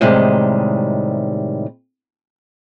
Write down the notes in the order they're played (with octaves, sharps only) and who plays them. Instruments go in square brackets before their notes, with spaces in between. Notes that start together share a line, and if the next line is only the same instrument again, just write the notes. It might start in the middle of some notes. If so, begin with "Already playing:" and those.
[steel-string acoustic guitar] A2 C3 D#3 G3 G#3